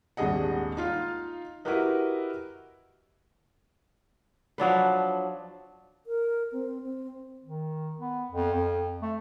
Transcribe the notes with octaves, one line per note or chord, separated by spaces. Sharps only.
D#1 G#1 G2 G#4 D#5 F#5
D#4 F4 F5
E4 F#4 G4 A#4 B4 D#5
F3 F#3 D4 B4
A#4
C4
C4
D#3
B3
F2
F2
A3